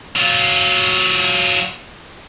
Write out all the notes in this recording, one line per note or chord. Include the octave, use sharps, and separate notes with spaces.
F#3 F4